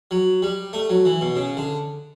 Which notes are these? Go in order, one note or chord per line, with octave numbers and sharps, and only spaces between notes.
F#3
G3
A3
F#3
E3
B2
C#3
D3